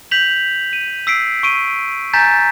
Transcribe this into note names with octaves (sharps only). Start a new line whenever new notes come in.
G6 B6 F7 F#7
D#7
E6 B6 C7 D7
C#6 D7 D#7
G#5 A#5 G6 A6 B6